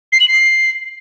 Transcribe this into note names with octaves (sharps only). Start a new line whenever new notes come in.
C7
F#7
C7